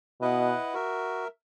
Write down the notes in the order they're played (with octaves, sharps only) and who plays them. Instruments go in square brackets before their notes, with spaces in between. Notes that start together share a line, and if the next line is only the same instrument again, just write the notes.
[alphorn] B2 [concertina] E4 B4 D#5 F#5
[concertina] F#4 A#4 E5